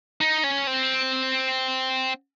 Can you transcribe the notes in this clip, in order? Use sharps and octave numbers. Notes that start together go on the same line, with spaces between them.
D#4
C#4
C4